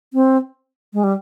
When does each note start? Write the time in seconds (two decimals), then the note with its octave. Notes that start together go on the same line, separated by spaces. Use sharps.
0.14 C4
0.94 G#3
1.04 G3